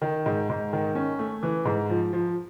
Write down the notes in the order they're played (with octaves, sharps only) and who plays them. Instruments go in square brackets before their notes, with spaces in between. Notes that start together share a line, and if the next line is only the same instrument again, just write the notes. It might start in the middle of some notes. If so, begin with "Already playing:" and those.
[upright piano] D#3
G#2
G#2
D#3
C#4
A3
E3
G#2
F3
F3